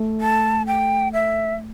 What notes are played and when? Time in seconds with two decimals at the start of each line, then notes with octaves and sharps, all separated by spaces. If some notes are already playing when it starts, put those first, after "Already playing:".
Already playing: A3
0.21 A5
0.67 G5
1.13 E5